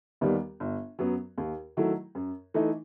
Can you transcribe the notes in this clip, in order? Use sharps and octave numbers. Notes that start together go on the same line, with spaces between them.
D#2 D#3 G3 B3
G1
F#2 F#3 B3
D#2
D#3 F#3 A3 E4
F#2
E3 A3 D#4